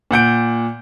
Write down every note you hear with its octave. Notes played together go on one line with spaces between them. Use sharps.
A#2 F#5 G6 D7